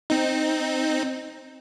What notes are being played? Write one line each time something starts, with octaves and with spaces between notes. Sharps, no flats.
C4 D#4